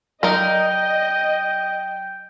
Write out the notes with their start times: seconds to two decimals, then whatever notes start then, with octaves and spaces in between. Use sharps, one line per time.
0.23 F#3 D#4 A#4 D5 D#5 G5